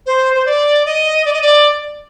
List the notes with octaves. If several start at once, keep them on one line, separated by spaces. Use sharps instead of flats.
C5
C5
D5
D#5
D5
D#5
D5